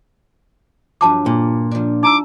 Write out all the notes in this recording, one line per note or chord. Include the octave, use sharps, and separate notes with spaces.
G2 F3 F#3 F#4 A5 D6
A#2
F3 D4
D#4 A#5 D6 E6